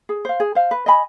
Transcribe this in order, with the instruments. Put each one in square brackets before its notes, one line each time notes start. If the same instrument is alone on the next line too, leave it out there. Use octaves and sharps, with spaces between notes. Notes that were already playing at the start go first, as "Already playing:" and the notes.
[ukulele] G#4
C5 F5
G#4
C5 F5
B4
D#5 G#5 B5